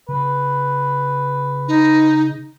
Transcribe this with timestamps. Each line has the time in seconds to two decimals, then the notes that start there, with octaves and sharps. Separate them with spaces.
0.09 C#3 B4
1.68 D#4